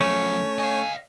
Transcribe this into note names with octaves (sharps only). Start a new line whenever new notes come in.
F#2 F3 A3 C#4 C#5
D#5 F5 G#5